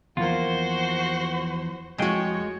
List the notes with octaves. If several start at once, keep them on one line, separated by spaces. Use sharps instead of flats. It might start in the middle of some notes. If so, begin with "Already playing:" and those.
E2 F3 A#3 F4 F#4 C5
F2 G#3 F#4 G#4 C#5 G5